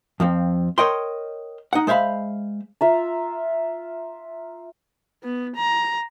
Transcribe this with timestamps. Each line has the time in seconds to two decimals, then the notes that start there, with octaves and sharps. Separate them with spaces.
0.20 F2 F3 C4
0.78 A#4 C#5 D#5 G5 C6
1.73 D#4 F#5
1.87 G#3 C5 E5 F5 B5
2.81 F4 E5 A#5
5.23 B3
5.56 A#5